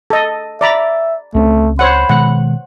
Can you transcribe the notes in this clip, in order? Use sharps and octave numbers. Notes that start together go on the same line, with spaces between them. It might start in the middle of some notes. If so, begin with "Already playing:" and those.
A4 D#5
D5 E5 A#5 B5
C#2 A3 C4 C#4
C5 C#5 F#5 B5
B2 D#3 G#3 F#5